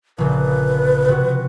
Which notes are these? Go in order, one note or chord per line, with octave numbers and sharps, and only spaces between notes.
A#1 C#3 B4
C3 F#4